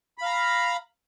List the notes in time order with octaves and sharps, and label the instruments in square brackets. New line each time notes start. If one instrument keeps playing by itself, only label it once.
[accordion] B5
F5
A#5